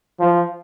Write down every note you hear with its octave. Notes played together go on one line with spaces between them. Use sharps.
F3